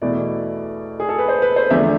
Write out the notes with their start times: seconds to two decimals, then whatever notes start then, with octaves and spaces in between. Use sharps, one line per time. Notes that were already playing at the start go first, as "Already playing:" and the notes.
0.02 E2 B2 A3 E4 D5
1.00 G#4
1.09 A4
1.18 B4
1.28 C5
1.42 B4
1.56 C5
1.70 E2 D3 F3 A3 E5